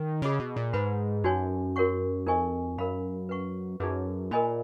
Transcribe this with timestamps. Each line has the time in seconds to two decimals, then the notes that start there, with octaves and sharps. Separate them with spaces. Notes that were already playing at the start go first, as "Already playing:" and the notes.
Already playing: D#3
0.22 C#3 G#4 D#5 F#5 B5
0.39 B2
0.56 A#2
0.73 G#2 B4 F#5 B5
1.24 F#2 D#4 F#4 C#5 G#5
1.76 F#4 A#4 C#5 F#5 C#6
2.26 F2 D#4 A#4 D#5 G#5 C#6
2.78 F#2 A#4 F5 B5
3.29 B4 F#5 C#6
3.80 F#2 D#4 G#4 B4
4.31 A#2 A#4 D#5 G#5 B5